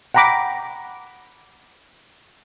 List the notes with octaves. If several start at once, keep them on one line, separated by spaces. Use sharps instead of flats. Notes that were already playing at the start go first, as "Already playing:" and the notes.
F#5 G5 A#5 B5 D6